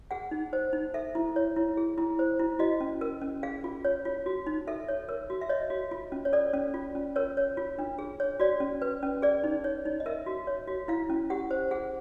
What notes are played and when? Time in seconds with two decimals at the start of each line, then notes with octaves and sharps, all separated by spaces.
0.11 G#4 F#5
0.31 D#4
0.53 C5
0.73 D#4
0.94 A4 E5
1.15 E4
1.36 C#5
1.56 E4
1.77 G#4
1.98 E4
2.19 C5
2.39 E4
2.59 F#4 D#5
2.81 C#4
3.01 A#4
3.21 C#4
3.43 G#4 F5
3.64 F4
3.85 C#5
4.05 F4
4.26 F#4
4.46 D#4
4.67 A4 E5
4.88 C#5
5.09 A#4
5.30 F#4
5.41 E5
5.49 C#5 D#5
5.70 F#4
5.91 F4
6.12 C#4
6.25 C#5
6.33 A4 D5
6.53 C#4
6.74 F4
6.95 C#4
7.16 A#4 C#5
7.37 C#5
7.57 F4
7.79 D4
7.99 G#4
8.20 C#5
8.40 F#4 D5
8.60 C#4
8.82 B4
9.03 C#4
9.22 G#4 D5
9.44 D#4
9.64 C#5
9.86 D#4
10.00 D#5
10.06 A#4 E5
10.26 F#4
10.47 C#5
10.67 F#4
10.88 E4 F5
11.10 C#4
11.30 G4 F#5
11.51 C5
11.71 G#4 F#5